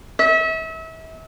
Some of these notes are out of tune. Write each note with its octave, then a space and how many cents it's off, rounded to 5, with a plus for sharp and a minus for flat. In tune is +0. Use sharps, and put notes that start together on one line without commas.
E5 -35